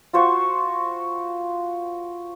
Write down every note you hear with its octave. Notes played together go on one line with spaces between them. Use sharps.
F4 F#4 C5 C#6